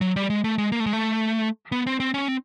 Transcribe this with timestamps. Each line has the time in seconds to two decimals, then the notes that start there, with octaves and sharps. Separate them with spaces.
0.01 F#3
0.16 G3
0.30 G#3
0.44 A3
0.58 G#3
0.72 A#3
0.80 A3
0.86 G#3
0.93 A3
1.72 B3
1.87 C4
2.00 C4
2.14 C#4
2.28 C4